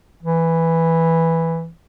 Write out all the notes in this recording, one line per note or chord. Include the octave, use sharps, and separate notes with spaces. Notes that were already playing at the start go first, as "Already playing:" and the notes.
E3